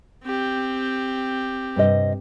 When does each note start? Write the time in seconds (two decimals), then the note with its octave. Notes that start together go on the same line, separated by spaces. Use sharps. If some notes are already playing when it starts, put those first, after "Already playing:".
0.24 C4 G4
1.76 G2 C3 D#5